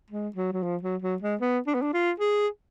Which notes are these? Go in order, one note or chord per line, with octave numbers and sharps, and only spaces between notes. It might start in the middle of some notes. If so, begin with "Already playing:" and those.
G#3
F#3
F#3
F3
F#3
F#3
G#3
B3
D4
B3
D4
F4
G#4